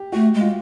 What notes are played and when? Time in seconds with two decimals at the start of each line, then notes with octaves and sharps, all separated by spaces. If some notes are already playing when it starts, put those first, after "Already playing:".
Already playing: G4
0.12 A3 F#4
0.34 G#3
0.41 F4